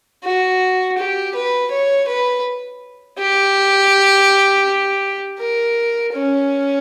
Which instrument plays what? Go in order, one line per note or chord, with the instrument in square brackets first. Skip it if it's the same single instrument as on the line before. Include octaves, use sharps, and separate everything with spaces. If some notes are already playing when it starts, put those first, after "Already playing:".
[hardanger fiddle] F#4
G4
B4
C#5
B4
G4
A#4
C#4